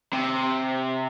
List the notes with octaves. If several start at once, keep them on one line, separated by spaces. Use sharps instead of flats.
C3